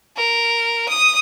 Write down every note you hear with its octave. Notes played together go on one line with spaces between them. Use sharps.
A#4
D#6